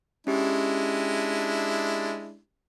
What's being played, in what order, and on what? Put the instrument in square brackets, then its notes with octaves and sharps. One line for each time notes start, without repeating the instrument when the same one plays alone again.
[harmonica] G#3 D4 E4 [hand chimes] C#4 G4